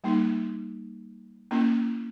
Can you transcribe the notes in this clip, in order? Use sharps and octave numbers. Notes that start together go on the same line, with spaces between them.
G3 A#3 D#4
A#3 C#4 E4